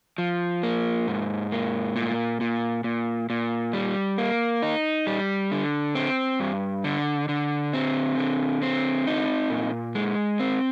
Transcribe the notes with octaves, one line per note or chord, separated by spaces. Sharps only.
F3
A#3
G#2
A#3
A#2
A#2
A#2
A#2
G3
A#3
D#4
G3
D3
C4
G2
D3
D3
C4
D3
C4
D#4
A#2
G#3
C4